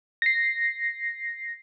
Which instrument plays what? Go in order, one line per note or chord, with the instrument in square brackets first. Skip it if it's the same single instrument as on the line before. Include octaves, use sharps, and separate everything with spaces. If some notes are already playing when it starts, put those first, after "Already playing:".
[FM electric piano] A#6 C7